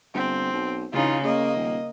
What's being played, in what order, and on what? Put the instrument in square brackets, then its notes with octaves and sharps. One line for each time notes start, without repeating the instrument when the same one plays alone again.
[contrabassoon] G1 [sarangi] C4
[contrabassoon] B1
[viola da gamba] C#3 D#4 [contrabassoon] E3 [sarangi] F4
[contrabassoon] C#3 [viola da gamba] A#3 [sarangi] D#5
[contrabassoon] D#1